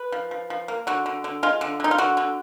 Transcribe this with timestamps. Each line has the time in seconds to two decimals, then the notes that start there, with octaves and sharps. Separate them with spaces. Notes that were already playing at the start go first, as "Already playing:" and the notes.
Already playing: B4
0.12 F3
0.31 F3
0.50 F3
0.68 A#3
0.87 D3 F#4
1.06 D3
1.24 D3
1.43 G#3 F4
1.61 D3
1.80 D3 D#4
1.91 F4
1.98 D3 F#4
2.17 D3